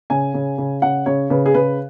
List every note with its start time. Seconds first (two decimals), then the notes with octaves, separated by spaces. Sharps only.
0.10 C#3 G#5
0.34 C#3
0.58 C#3
0.82 C#3 F#5
1.06 C#3 C#5
1.30 C#3 B4
1.46 G#4
1.54 C#3 B4